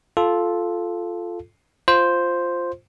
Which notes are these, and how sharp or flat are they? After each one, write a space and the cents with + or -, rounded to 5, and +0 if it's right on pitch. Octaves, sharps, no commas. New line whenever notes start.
F4 +0 A4 -10
F4 +0 C5 +0